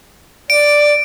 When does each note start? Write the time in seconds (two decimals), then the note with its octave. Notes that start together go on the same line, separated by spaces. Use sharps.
0.50 D5 D7